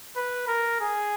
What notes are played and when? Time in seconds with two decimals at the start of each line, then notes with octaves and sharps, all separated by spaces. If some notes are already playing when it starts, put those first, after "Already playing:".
0.16 B4
0.48 A#4
0.81 G#4